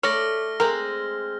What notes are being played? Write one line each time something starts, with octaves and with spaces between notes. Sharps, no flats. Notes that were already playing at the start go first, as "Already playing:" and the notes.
A3 C#5 D5 B5 F6 A#6
G#3 C4 A#4